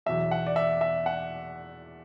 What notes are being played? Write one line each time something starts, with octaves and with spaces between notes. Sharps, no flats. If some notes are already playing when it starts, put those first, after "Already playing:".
E2 B2 F#3 E5
F#5
D5
E5
E5
F#5